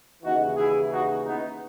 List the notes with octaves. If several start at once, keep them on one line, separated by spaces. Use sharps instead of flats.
D#2 C#3 E3 D#4 F#4
E4 G#4
D#4 F#4
B3 D#4